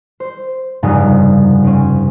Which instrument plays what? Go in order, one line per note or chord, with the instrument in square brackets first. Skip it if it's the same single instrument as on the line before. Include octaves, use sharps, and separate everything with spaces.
[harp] C5
F1 G2 C#3 D#4
C4 C#4